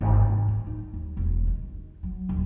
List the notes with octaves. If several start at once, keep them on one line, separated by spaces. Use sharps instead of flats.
G#1
D#3
A2
D#4
D#2
E1
D#3
F#3
D#1